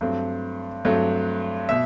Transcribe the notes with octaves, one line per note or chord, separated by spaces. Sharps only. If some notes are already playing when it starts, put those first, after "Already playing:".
G2 F#3 A3 C4
G2 F#3 A3 C4
B2 E5